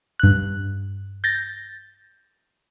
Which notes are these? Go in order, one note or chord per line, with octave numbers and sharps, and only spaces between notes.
G2 F#6
G6 A6 A#6